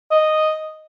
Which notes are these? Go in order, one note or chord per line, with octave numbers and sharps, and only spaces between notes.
D#5